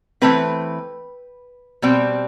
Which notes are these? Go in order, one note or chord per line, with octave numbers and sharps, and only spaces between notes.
E3 A3 C4 B4
B2 G3 C4